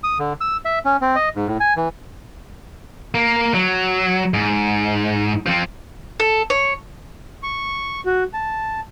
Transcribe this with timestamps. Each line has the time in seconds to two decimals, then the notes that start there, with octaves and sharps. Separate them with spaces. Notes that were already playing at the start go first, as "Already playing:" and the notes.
0.04 D#6
0.19 D3
0.41 E6
0.65 E5
0.85 C#4
1.01 C4
1.16 D#5
1.36 G#2
1.48 A2
1.60 G#5
1.77 E3
3.15 A#3
3.54 F#3
4.34 G#2
5.47 F3 C4
6.20 A4
6.50 C#5
7.43 C#6
8.06 F#4
8.34 A5